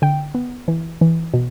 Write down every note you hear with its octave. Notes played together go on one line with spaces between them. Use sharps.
D3 G5
B3
E3
E3
B2